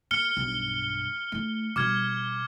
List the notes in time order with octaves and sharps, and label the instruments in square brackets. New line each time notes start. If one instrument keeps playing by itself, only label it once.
[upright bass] A#3 [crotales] F6 C#7 G7
[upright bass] B1 G2
A3 E4
[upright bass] B2 G3 [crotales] D6 F6 G#6